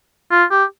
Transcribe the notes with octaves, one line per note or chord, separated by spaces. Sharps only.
F4
G4